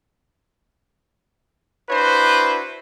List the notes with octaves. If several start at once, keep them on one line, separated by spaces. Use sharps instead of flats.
D4 E4 F#4 B4 C5